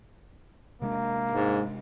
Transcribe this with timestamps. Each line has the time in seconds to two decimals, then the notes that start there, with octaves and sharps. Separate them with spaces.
0.82 C3 G#3 A#3 D4
1.31 G#2